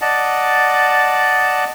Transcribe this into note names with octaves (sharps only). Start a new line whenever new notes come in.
D5 D#5 F#5 A5